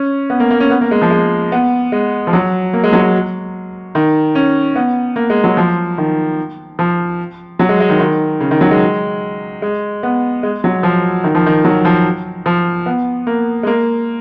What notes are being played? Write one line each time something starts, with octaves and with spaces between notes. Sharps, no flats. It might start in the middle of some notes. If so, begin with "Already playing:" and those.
Already playing: C#4
B3
A#3
A#3
C#4
B3
A#3
G#3
F3
G#3
B3
G#3
F3
F#3
A#3
G#3
F#3
G#3
D#3
C#4
B3
A#3
G#3
F#3
F3
D#3
F3
F#3
G#3
G#3
D#3
D#3
C#3
D#3
F#3
G#3
G#3
B3
G#3
F#3
F3
D#3
F3
D#3
F#3
F3
F3
B3
A#3
G#3
A#3